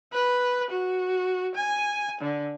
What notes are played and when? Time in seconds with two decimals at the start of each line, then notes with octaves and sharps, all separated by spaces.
0.13 B4
0.70 F#4
1.55 G#5
2.21 D3